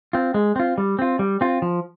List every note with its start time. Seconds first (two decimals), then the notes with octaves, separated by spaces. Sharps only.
0.13 C4 F4
0.34 G#3
0.56 C4 F4
0.78 G3
0.99 C4 F4
1.19 G3
1.41 C4 F4
1.62 F3